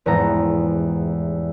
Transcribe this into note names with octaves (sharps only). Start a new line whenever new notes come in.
F1 E2 G#2 B3 A4 A#5